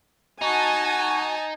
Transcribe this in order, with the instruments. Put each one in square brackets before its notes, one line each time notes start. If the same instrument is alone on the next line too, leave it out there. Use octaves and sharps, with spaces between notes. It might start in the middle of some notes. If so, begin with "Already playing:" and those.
[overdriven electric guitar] D#4 [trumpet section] F#4 [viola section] G#5 A5